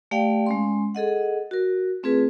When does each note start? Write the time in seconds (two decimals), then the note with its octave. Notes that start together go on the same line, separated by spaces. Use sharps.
0.11 A3 G4 D5 F5 G5
0.46 G#3 C#4 C6
0.95 G#4 A4 D#5 F#5
1.51 F#4 A#4
2.03 A3 C4 F4 G#4 B4